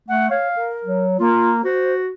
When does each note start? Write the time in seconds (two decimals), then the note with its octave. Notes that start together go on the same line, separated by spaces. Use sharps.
0.09 A3 F#5
0.31 C#5 F5
0.56 A#4
0.85 F#3
1.19 A#3 F4
1.65 F#4 C5